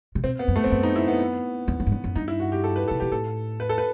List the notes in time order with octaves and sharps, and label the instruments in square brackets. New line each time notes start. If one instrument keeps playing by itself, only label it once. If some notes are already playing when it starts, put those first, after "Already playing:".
[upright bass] C3
[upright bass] B2 [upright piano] C4
[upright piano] B3
[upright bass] F#2
[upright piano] A3
C4
[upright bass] E2
[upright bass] F#2 [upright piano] B3
[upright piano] D#4
E4
B3
[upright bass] E2
F#2
G2
F#2
F#2
[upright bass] G2 [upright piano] D#4
[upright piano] E4
F#4
G4
A4
B4
A4
[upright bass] C3
[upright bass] B2 [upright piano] G4
[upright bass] A2 [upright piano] A4
[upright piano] B4
A4
B4